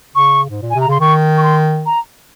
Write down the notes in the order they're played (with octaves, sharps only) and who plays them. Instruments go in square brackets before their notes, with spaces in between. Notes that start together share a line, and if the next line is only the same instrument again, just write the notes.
[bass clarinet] C#3 [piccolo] C#6
[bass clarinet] G#2
A#2
[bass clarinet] C3 [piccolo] G#5
[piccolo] A#5
[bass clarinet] C#3 [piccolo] C6
[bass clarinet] D#3 [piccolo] C#6
[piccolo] C#6
C6
A#5